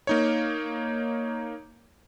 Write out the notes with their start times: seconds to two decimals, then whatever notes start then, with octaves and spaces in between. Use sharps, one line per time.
0.07 A#3 D#4 C#5